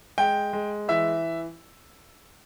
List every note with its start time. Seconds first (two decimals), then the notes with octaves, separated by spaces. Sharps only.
0.18 G#3 G5
0.53 G#3
0.88 E3 E5